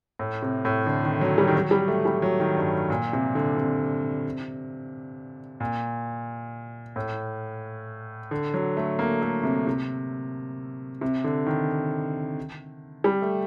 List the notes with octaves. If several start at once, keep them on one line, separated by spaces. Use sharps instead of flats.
A2
C3
A2
D3
D#3
F#3
G3
D#3
F#3
G3
A3
G3
F#3
D#3
G2
A#2
C3
D3
C3
A#2
A2
D3
F#3
A3
A#3
A3
C3
C3
C3
D3
D#3
G3
A3